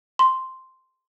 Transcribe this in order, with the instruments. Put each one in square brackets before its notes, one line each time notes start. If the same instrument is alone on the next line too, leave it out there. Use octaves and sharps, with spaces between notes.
[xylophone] C6